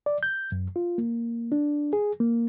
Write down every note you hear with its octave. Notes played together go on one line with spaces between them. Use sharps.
D5
G6
F#2
F4
A#3
D4
G#4
A#3